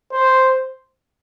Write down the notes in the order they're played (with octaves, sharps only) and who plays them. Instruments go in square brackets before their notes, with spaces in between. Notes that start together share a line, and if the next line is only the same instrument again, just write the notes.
[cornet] C5